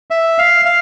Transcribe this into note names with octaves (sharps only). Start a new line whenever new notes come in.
E5
F5
F5